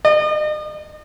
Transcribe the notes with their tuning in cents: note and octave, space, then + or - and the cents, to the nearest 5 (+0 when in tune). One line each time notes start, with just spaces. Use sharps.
D#5 -40